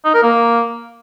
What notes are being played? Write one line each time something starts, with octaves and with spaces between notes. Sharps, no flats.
D#4
A#4
A#3